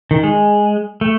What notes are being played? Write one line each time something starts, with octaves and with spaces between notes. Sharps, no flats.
D#3
G#3
A3